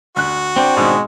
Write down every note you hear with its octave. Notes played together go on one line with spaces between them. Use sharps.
D2 F#4 F#6
C4 D4 G5
G#2 B2 D#3 G#3